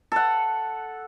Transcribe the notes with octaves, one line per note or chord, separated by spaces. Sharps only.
A4 F#5